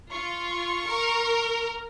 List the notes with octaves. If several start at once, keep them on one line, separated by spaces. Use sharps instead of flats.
F4 C#6
A#4